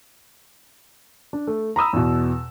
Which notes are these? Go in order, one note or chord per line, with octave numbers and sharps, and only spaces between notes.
D4
A3
A#5 B5 D#6 E6
E2 B2